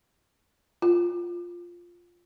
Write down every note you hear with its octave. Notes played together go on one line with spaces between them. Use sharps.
F4